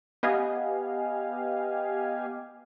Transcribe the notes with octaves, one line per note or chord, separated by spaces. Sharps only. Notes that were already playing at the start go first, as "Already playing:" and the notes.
B3 G4 D#5 F5 G#5